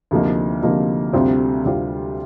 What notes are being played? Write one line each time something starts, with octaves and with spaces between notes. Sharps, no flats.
D2 C3 F3 A#3 D#4
D2 C3 F3 A#3 D#4
D2 C3 G3 C4 F4
D2 C3 G3 C4 F4